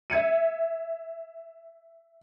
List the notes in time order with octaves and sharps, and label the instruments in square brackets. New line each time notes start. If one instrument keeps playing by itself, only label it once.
[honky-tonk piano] E5 G#6 C#7 D#7